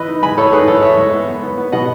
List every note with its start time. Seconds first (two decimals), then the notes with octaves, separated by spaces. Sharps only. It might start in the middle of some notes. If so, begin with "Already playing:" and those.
Already playing: E3 B4 D#5
0.08 D#4
0.23 G#3 G#5 B5
0.37 A2 A4 C#5
0.52 D#4 G#4 B4
0.68 E3 A4 C#5
0.82 E3 C#5 E5
0.97 G#3
1.13 B3
1.28 B3
1.43 B3
1.58 B3
1.72 B2 D#5 F#5